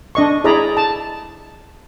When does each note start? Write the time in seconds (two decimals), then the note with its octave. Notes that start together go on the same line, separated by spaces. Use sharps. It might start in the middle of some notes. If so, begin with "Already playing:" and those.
0.15 D4 D#5 C#6
0.44 E4 G#4 D5 D#5 A#5 B5
0.77 A5